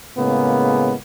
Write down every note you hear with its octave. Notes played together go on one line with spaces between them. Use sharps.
A2 C#3 G#3 A#3 B3